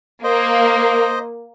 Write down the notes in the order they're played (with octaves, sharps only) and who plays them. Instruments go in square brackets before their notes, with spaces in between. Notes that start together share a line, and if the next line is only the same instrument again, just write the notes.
[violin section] A#3 [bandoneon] C5 D#5